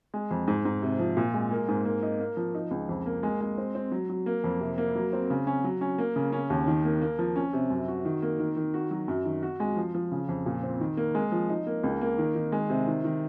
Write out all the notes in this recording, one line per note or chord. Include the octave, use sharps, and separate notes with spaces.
G#3
F2
G#2
G#2
C3
F3
A#2
G#3
A#3
G#2
A#3
D#4
A#3
F3
D#4
C#2
F2
A#3
G#3
G#3
C4
C4
F#3
F#3
A#3
F2
C3
A#3
F#3
C4
C#3
C#4
F#3
C#4
A#3
C#3
C#4
D#2
D#3
A#3
A#3
F3
C#4
C3
F#2
F#4
D#3
A#3
D#3
D#3
F#4
F#3
F#2
D#3
F#4
G#3
F3
F3
C#3
F2
A#2
C4
D#3
A#3
G#3
F3
D#4
A#3
C#2
A#3
D#3
D#3
G#3
C3
D#3
D#3